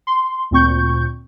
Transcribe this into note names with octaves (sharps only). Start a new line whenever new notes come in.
C6
D2 A#2 C4 C#6 G6